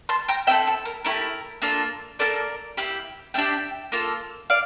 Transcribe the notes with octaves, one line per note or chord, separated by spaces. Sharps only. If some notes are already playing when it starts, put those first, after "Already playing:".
A5 C6
G5 A#5
C4 E4 A4 E5 G5
A4
A#4
A3 E4 G4 A#4
A#3 D4 F4 A4
A#3 E4 A4 A#4 D5
A#3 E4 G4
A3 D4 G4 E5 G5
A#3 F4 A4
D5 F5